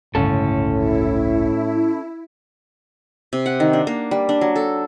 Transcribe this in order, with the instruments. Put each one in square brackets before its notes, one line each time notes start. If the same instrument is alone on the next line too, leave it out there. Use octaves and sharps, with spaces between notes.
[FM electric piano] G1 C#2 [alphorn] A2 [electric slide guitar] C#4 A4
[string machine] E4
[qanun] C3
F#5
D#3
D4
A#3
G3
D4
F#3
A4